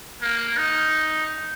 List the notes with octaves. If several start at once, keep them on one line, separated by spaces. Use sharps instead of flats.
A#3
D#4